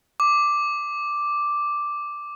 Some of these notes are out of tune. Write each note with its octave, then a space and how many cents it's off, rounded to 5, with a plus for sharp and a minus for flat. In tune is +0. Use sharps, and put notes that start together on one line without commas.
D6 +0